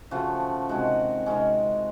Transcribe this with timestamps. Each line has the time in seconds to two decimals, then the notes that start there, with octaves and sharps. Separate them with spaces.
0.11 C#3 F3 A3 F#4
0.69 C3 D#3 G#3 F#4
1.26 C3 D#3 G#3 C#4